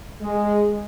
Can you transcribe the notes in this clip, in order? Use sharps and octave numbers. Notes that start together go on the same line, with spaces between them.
G#3